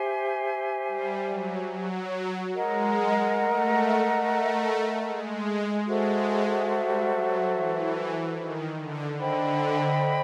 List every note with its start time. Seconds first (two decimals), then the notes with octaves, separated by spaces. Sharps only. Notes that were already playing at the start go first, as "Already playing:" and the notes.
Already playing: G4 C5 E5 G#5
0.88 G3
1.29 F#3
1.71 F#3
2.54 G#3 A#4 D#5 F#5 A#5
3.37 A3
4.20 A3
5.03 G#3
5.86 G#3 F#4 A4 C5 E5
6.70 G3
7.11 F#3
7.52 E3
8.35 D#3
8.77 D3
9.18 D3 C5 D#5 G5 B5